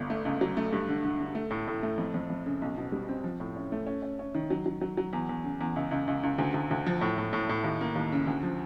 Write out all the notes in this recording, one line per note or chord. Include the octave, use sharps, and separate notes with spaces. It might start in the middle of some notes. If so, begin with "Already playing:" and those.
Already playing: G1
A3
C#2
F#3
A3
G2
D3
D3
D3
A3
A2
A2
A3
F2
F2
F2
C#3
B1
B2
G3
C4
F3
A2
C#4
A3
C#4
C#4
C#4
D#3
F#3
F#3
F#3
F#3
E2
E2
C#3
E2
C#2
C#2
C#2
C#2
D2
D2
D2
F3
A2
A2
A2
A2
D#2
A#3
D#2
C#3
D2
F3